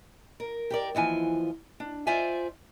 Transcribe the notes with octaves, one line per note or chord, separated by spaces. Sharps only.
A#4
G4 A#4 D5
D#2 E3 F3 G#5
D4
F4 C5 D5 E5 G#5